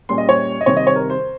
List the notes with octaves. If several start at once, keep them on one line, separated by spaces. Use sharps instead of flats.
A#2 G3 C#4 C6
D#5
C#5
D#5
C3 D#3 G3 C4 C#5
D#5
C#5
A#4
C5